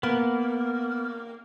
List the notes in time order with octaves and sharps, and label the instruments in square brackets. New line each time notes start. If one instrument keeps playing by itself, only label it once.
[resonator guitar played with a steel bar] A#3 [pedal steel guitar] B3